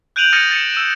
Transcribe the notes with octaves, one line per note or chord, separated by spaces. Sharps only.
F#6 G6 D7 D#7 F7 F#7
D#6 F6 A6 A#6 C#7 D#7
A6 C#7 D#7 E7
E6 D#7 E7